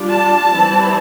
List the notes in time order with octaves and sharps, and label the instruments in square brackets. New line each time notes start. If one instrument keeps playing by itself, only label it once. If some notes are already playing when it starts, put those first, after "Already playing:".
Already playing: [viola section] G3 D4 F4
A5
E3 G3 C4 E4